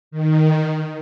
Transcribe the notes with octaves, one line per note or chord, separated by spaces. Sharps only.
D#3